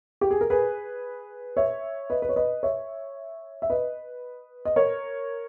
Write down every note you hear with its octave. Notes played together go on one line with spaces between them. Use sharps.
G4
G#4
A#4
G#4 B4
C#5 E5
B4 D#5
B4
C#5
B4 D#5
C#5 E5
E5
B4 D#5
D#5
A#4 C#5